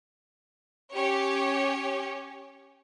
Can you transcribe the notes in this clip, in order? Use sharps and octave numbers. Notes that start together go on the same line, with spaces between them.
C#4 G4 C#5